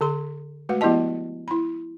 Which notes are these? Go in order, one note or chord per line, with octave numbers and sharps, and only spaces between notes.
D3 G#4 C6
G#3 A3 F#4 B4 F#5
F3 B3 E4 G4 D#5 A5
E4 B5